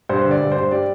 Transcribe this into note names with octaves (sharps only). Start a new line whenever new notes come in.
G2 C5
D3
D5
G2
C5
G2
G3 D5